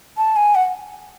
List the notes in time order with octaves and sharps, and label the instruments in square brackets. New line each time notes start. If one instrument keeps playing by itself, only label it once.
[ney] A5
G#5
F#5